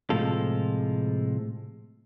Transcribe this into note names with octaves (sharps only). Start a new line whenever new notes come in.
A2 C3 F3 G#3 F4 A4